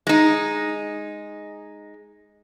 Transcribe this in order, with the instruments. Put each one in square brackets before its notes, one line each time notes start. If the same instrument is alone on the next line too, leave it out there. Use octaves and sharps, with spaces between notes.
[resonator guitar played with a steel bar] G#3 D#4